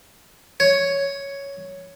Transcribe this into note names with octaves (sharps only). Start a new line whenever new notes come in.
C#5